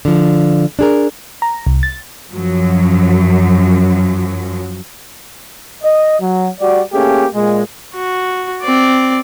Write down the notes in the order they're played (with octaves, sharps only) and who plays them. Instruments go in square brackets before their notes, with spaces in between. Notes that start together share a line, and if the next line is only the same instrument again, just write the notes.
[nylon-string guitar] D3 F3
D4 G#4 A#4
[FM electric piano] A#5
C2
A6
[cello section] F#2 F3 F#3
[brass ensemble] D#5
F#3
G3 F#4 D5
A3 A#3 C#4 G4 G#4
A#2 G#3
[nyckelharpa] F#4
C4 D5